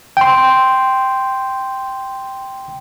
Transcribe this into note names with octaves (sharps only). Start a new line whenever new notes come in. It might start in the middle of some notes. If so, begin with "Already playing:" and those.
G5 C6